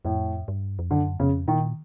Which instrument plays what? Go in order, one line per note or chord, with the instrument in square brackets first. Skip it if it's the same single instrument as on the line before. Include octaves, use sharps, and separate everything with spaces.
[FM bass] F2 [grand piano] A2
[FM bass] G2
F2
[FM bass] F#2 [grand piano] D3
[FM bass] F2 [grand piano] C#3
[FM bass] A#2 [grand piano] D#3